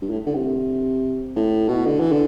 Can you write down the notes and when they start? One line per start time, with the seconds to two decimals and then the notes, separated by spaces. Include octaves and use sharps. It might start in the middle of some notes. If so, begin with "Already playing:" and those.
0.02 G2
0.10 A2
0.26 D3
0.35 C3
1.36 A2
1.68 B2
1.86 D3
2.00 E3
2.12 D3